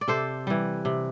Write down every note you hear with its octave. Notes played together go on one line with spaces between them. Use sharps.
D5
C3 A4 C5
E3 G3
C3